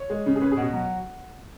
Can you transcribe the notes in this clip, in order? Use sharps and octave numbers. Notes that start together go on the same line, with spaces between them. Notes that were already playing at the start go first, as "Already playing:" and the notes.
Already playing: C#5
G#3
C#3
G#4
C#4 B4
G#4
B2
F#4
F#3